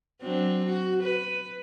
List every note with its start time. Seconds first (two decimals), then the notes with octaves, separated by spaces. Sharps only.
0.21 F#3 C4 D4
0.64 F#4
1.02 B4